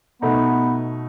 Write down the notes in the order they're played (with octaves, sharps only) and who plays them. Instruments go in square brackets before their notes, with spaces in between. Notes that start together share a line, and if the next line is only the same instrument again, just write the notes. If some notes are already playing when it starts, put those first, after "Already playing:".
[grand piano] B2 A3 D#4 [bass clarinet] B3